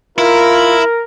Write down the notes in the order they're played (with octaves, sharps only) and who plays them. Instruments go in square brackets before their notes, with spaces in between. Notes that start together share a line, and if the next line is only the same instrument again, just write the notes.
[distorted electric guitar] E4 [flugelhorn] F4 [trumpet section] A#4